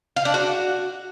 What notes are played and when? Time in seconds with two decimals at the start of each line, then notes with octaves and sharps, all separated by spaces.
0.16 F5
0.25 D4
0.34 F#4